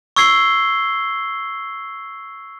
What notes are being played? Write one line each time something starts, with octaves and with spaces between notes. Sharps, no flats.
C#6 E6 G#6 C7 G7